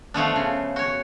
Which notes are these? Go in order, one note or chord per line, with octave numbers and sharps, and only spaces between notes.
F3 A3 B3 D4
C#3
F#4 C#5